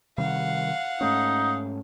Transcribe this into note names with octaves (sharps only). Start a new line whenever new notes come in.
C3 D#3 G3 F5 F#5
G#2 A3 C#4 D#4